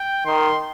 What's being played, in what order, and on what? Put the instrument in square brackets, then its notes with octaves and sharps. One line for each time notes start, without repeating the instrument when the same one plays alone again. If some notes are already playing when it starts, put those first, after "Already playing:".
Already playing: [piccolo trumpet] G5
[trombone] D#3 [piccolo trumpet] C6